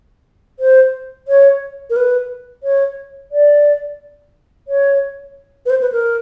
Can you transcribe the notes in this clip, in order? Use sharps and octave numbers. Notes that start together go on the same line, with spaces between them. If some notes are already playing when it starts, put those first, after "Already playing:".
C5
C#5
A#4
B4
C#5
D5
C#5
B4
C5
B4
A#4